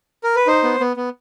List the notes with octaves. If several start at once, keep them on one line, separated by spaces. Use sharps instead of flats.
A#4
B4
D#4 C5
B3
B3
B3